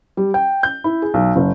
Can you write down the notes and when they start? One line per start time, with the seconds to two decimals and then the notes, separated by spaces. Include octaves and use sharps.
0.17 G3
0.34 G5
0.63 G6
0.84 E4
1.02 G#4
1.14 B1
1.36 F#1